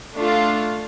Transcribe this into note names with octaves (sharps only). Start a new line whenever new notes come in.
A3 D4 F4